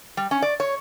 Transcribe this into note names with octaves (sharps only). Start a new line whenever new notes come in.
G3
C#4
D5
C#5